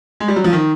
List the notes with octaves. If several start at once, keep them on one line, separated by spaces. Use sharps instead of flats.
G#3
G3
F#3
F3
D#3